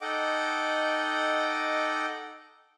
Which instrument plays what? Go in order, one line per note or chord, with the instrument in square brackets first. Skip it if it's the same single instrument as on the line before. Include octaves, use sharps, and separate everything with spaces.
[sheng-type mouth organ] D#4 A4 D#5 F#5 G5 D6